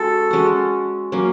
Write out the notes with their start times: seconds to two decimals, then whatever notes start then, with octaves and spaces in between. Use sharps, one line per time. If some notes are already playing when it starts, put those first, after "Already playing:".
Already playing: G#3 C#4 F#4 A4
0.31 G#3 C#4 F#4
1.12 F#3 A#3 C#4